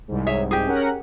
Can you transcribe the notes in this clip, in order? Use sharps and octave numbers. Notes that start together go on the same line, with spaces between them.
C2 G#2
G#4 C#5 E5
G4 G#4
C#4 A#4 F#5